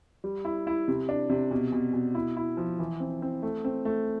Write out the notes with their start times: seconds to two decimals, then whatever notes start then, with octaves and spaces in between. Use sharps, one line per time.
0.24 G3
0.45 E4
0.67 E4
0.88 C3
1.09 D4
1.29 C3
1.51 B2
1.72 B2
1.93 B2
2.15 E4
2.37 E4
2.57 F3
2.79 E3
3.00 C4
3.22 C4
3.43 A3
3.64 C4
3.85 A3